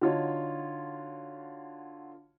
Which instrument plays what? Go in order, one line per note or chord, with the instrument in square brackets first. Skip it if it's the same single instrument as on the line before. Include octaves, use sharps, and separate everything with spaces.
[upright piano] D3 D#4 F4 F#4 C#5